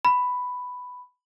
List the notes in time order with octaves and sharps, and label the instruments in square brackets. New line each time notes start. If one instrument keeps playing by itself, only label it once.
[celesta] B5